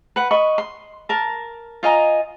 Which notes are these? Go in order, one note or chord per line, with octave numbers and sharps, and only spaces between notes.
B4 F#5
D#5 B5 C#6
C6
A#4 A5
F4 D#5 G#5 A#5